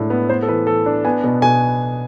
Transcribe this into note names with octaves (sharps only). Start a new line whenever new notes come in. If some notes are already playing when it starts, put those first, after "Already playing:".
Already playing: A2 G#3 D4 A4
B3
B3 C5
A4
E3 B4
E3 A4
D4
B3 G#5
B2
B2 G#5